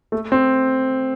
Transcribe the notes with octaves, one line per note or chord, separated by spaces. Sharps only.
A3
C4